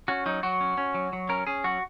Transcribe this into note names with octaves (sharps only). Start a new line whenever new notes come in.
C#4 F#4
F#3 D#4
F#3 F#4
C#4
C#4
F#3
F#3
C#4 A#4
C#4 G#4
F#3 F#4